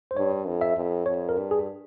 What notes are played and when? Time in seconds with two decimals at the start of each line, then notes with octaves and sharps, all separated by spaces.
0.11 C5
0.16 G2 C#5
0.47 F2
0.61 E5
0.76 F2
1.06 F2 C#5
1.29 A#4
1.37 G2
1.51 G#4